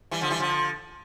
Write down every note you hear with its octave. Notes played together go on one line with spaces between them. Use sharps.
E3 G3
D3 F3
E3 G3
D3 F3